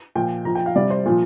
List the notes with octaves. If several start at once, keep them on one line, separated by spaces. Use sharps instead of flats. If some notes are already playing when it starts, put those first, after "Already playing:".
A#2 F3 G5
A#2 F3 A#5
G5
F5
C3 G3 D5
C5
A#2 F3